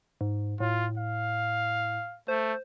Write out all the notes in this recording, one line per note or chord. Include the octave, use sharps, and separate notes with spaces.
G#2
A2 F4
F5
A3 C5